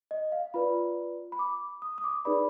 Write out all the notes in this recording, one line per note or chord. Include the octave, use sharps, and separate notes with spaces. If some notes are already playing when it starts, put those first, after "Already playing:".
D#5
F5
F4 B4 D5 B5
B5
D6
D#6
D#6
D6
D#4 G#4 B4 D5 B5